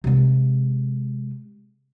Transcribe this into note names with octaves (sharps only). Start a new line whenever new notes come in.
C3 G#3